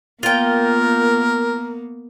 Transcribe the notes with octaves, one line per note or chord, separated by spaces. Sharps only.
A#3 B3 F4 A#4 G5